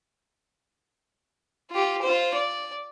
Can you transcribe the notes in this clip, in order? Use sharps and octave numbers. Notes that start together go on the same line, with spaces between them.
F4 G4
F4 C5
D5